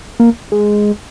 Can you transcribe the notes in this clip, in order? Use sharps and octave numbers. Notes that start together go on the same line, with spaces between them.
A#3
G#3